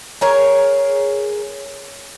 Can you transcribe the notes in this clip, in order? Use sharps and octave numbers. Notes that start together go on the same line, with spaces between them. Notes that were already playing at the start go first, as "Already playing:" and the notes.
G#4 A#4 C#5